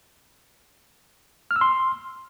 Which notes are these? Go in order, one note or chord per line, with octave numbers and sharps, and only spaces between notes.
F6
E6
C6